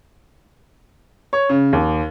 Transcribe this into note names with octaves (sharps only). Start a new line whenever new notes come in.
C#5
C#3
D#2